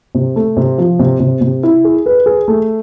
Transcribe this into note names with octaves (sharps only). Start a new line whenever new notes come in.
C3
A3
C3
F3
C3
C3
C3
E4
G#4
B4
G#4
A3